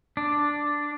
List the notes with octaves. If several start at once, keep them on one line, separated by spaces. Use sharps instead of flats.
D4